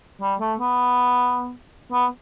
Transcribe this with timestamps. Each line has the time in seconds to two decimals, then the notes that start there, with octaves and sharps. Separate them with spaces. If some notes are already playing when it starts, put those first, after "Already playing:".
0.21 G3
0.40 A3
0.59 B3
1.93 B3